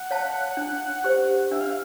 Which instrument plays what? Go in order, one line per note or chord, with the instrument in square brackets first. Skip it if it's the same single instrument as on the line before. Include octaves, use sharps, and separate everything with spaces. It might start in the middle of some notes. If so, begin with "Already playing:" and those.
Already playing: [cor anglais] F#5
[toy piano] C#5 F5 A5
D4
G4 C5
[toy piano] D4 [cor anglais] E5
[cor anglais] F5